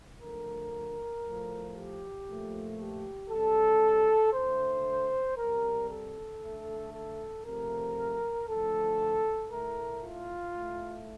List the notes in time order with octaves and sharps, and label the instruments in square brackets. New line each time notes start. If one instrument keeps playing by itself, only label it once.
[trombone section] D3 F3 A3 A#4
A2 F3 A3
G4
A#2 F3 A3
G4
C3 G3 A4
D3 A3 C5
C3 G3 A#4
A4
D3 A3
A4
C3 F3 A3 A#4
D3 F3 A3 A4
A2 A3 A#4
F4
A2 A3